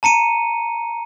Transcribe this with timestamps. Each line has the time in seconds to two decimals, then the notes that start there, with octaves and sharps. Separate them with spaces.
0.03 A5 A#5 C#7 D#7